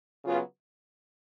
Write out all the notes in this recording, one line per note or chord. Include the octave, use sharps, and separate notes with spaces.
C#3 F#3 B3 F4